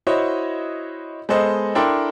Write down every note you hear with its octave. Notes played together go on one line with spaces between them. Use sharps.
E4 F#4 C5 C#5 D#5
G#3 B3 A4 C5 D#5
D4 E4 A4 A#4 G5 C6